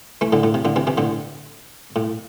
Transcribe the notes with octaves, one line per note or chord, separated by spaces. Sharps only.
E3 A3
A2 D3
A2
C3
A2 D3
C3 E3
C3 E3
A2 D3
A2